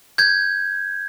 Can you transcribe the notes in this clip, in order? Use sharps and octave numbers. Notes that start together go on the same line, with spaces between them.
G6 G#6